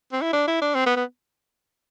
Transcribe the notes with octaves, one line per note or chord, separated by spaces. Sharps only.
C4
E4
D4
E4
D4
C4
B3
B3